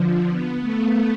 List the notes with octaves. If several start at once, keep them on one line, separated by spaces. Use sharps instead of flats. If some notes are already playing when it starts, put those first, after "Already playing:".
Already playing: D3 F3
B3
A3